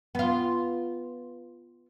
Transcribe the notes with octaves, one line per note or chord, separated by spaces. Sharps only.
B3 F4